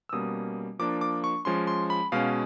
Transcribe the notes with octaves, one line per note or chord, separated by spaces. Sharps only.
E6
B2 G3 A#3 C#4 D#6
F3 A#3 D4 D6
D6
C#6
F3 G#3 C#4 C6
C6
B5
B2 G#3 C#4 F5